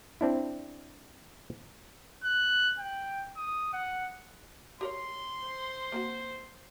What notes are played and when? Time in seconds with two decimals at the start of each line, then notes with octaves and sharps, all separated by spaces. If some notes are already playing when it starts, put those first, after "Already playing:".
0.21 C4 D4 E4
2.24 F#6
2.79 G5
3.36 D#6
3.73 F#5
4.81 G4 A#4 C#5 C6
5.43 C5
5.92 A#3 C4 F#4